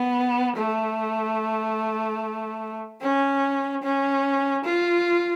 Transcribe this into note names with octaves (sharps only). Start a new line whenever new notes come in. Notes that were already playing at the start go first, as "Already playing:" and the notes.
Already playing: B3
A3
C#4
C#4
F4